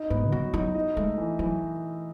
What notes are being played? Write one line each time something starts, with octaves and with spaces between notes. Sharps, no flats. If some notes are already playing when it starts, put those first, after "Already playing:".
Already playing: D#4
G#2 B3
E3
F#3 F#4
F#3 D#4
D#4
G#3 A3
E3
E3 F#3